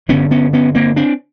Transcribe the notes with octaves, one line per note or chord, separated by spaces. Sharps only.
G1 G2 D3 B3 C#4
B3 C#4
B3 C#4
A#3 C4
C4 D4